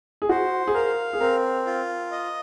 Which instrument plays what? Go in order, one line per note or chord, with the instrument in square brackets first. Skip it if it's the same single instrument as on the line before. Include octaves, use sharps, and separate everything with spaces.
[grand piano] G#4
[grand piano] F#4 [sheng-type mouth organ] C5
[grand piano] G#4
[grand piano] A#4 [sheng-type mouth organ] F5
[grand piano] G#4
[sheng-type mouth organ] C4 [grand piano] A#4
[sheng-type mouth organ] F4
D#5